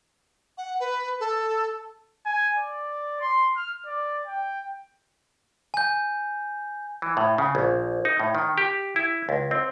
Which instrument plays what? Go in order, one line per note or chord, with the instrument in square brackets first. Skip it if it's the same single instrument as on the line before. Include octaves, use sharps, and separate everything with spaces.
[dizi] F#5
B4
A4
[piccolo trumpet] G#5
D5
C6
F6
D5
G5
[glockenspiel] G#5 G6
[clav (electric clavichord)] E3
A2
C#3
A#1
D#4
A2
D#3
G4
E4
C#2
C4